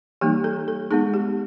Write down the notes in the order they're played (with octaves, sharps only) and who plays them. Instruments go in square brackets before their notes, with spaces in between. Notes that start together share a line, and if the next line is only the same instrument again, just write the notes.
[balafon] E3 G3 A#3 D#4 G4
A4
A4
G#3 B3 D#4 G#4
G4